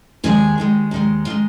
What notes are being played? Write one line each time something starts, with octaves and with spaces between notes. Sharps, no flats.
D#2 D#3 G#3 G#4
D#2 D#3 G#3
D#2 D#3 G#3
D#3 G#3 F4